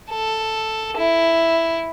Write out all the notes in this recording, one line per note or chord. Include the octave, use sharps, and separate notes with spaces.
A4
E4